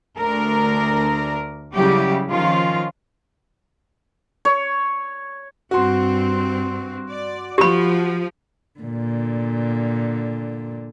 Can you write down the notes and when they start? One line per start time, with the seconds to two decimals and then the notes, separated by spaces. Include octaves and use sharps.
0.17 D2 D4 A#4
1.75 C#3 F#3 G3 E4 G4
2.30 D#3 F3 C#4 F4
4.45 C#5
5.71 G2 C4 F#4 C6
7.09 D5
7.58 F3 G4 B5
8.80 A#2 D3